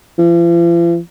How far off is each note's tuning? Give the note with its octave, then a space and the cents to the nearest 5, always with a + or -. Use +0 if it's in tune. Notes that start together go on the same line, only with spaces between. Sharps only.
F3 -45